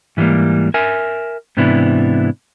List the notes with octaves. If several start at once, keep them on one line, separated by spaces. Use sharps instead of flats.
G#2 E3 F#3 G3 A#3
A#4 E5 G#5
G#2 C3 E3 B3 D4 E4